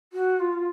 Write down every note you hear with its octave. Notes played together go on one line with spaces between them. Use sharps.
F#4
F4